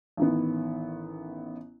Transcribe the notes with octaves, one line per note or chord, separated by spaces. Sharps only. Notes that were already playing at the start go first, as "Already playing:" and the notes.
A1 D#3 B3